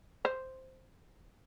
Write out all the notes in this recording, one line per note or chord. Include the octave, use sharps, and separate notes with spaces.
C5